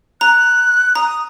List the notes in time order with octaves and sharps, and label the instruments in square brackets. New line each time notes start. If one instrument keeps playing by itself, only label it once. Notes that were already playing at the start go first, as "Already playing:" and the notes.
[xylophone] A#5 [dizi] F#6
[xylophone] A#5 [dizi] D#6